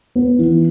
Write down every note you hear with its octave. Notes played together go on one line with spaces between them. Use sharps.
B3
E3